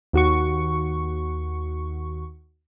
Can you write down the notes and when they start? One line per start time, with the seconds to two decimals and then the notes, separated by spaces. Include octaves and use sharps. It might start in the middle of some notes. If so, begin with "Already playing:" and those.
0.13 D#2 F#4 C#6